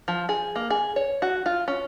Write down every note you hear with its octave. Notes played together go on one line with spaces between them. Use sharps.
F3
G#4
A#3
G#4
C#5
F#4
F4
C#4